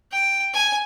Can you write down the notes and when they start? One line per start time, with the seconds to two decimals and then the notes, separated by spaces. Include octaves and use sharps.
0.12 G5
0.54 G#5